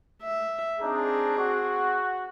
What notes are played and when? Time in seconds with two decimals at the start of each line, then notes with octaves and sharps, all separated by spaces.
0.23 E5
0.82 C4 D4 D#4 G#4
1.36 F#4